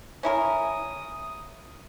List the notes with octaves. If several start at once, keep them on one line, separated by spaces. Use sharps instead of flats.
C#4 E4 A#4 D#6